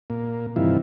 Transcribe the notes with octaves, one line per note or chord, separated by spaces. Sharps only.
A#2 A#3
G2 C3 D#3 E3 E4 F4